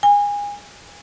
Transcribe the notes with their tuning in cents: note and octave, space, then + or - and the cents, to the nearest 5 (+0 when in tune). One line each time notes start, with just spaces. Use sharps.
G#5 -25